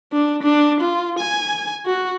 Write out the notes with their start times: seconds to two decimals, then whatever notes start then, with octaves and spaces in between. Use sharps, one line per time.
0.13 D4
0.43 D4
0.81 F4
1.19 G#5
1.86 F#4